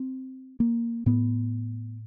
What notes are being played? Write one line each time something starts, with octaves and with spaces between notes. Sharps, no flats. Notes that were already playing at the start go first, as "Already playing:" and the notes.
Already playing: C4
A#3
A2 B3